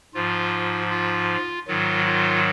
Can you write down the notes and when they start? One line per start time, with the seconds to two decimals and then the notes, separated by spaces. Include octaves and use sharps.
0.14 G#2 F3 F4
0.90 F4
1.68 G#2 D#3 F#3 F4
2.06 F4